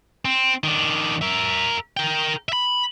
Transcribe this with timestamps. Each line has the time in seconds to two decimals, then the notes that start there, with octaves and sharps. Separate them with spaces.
0.25 C4
0.64 D#3 D4
1.21 A#4 E5
1.97 A#4 G5
2.49 E5 B5